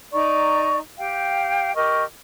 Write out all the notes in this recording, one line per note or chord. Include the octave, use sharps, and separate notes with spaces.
D#4 D5 A#5 C#6
G4 F5 G5
G4 A#4 D#5 C#6